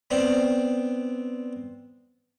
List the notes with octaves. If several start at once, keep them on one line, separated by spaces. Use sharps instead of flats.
B3 C4 D4